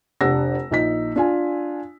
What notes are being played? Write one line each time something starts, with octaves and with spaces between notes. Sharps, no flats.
F1 D4 G4 F#5 E6 A#6
A#1 D#4 B6
D4 F4 G#5